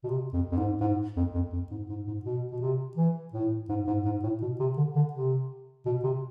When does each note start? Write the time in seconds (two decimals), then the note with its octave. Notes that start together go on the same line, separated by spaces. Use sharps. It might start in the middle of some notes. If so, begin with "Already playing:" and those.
0.04 B2
0.09 C3
0.33 F2
0.52 F2
0.57 G#2
0.81 G#2
1.17 F2
1.35 F2
1.53 F2
1.71 G#2
1.89 G#2
2.07 G#2
2.25 B2
2.51 B2
2.61 C3
2.97 E3
3.34 A2
3.69 G#2
3.87 G#2
4.05 G#2
4.23 A2
4.42 B2
4.60 C3
4.77 D3
4.96 D3
5.13 C3
5.86 B2
6.04 C3